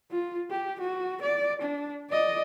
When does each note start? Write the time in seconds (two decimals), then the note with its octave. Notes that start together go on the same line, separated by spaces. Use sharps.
0.11 F4
0.50 G4
0.81 F#4
1.22 D5
1.62 D4
2.10 D5 D#5